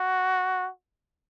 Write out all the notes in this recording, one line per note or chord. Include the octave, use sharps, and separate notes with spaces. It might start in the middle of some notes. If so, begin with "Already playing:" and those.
Already playing: F#4